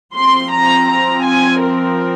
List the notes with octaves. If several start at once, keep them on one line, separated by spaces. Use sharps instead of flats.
F3 C4 C6
A#5
A#5
G#5
A#4